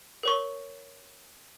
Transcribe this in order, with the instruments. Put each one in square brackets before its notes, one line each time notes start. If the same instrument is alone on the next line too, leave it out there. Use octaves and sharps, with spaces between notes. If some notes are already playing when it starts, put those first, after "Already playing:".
[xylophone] A#4 C#5 C#6